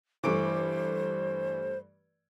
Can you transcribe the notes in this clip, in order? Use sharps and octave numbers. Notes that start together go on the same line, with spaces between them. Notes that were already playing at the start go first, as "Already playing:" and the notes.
G2 E3 A3 C5 C#6 D6 D7